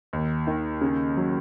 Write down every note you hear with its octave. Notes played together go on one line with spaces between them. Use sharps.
D#2
D#3
C#3
F#3